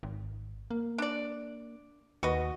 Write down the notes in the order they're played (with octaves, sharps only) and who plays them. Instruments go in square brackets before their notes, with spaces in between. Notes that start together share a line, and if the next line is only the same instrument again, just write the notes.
[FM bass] G#1
A#3
[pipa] D4 D5
[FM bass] D#2 [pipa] F#4 B4 D#5